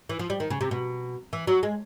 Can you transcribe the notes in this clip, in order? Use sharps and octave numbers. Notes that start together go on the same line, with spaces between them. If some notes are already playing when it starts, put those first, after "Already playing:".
E3
F3
G3
D#3
C#3
C3
B2
E3
F#3
G#3